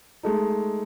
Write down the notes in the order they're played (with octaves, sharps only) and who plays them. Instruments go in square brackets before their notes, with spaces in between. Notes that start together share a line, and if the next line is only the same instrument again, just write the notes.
[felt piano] G#3 A3 D#4